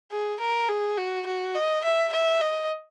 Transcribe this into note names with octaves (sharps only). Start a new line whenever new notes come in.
G#4
A#4
G#4
F#4
F#4
D#5
E5
E5
D#5